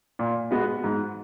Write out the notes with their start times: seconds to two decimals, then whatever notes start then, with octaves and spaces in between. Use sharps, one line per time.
0.19 A#2
0.51 G#3 B3 F#4
0.84 G#2